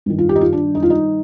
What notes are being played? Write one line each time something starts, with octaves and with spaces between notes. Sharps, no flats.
G2 D#3
F4
G4
D#4
F4
D4
D#4
F4
D#4